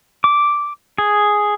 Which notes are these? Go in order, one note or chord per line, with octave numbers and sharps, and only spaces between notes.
D6
G#4